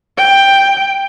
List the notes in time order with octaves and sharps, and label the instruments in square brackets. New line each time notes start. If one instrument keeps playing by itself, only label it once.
[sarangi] G5